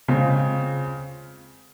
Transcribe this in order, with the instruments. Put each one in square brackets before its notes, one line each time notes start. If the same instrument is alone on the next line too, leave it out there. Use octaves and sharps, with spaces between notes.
[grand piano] C#3 G#3 C4 F4 C5